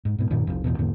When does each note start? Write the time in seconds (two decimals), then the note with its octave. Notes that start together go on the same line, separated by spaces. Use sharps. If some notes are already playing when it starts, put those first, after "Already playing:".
0.05 G#2
0.19 G#2 B2
0.31 F#2 A#2 D#3
0.47 F1 C2 F2
0.64 E1 A1 E2 B2
0.78 E2 G#2 D3 A#3